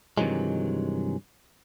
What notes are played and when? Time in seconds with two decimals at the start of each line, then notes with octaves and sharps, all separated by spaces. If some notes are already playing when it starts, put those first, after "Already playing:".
0.18 G2 C3 D#3 E3 F#3 G#3